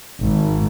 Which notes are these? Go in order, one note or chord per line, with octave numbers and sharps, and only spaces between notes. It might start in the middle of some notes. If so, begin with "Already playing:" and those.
G#1